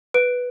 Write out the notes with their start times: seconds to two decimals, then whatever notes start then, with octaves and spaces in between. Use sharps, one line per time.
0.14 B4 D7